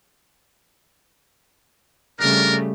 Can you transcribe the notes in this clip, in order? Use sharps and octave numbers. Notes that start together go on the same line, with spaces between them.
C#3 G3 A3 D4 A#4